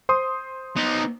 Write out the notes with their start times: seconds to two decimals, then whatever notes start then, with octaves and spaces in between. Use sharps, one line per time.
0.09 C5 C6 D#6
0.76 B3 D#4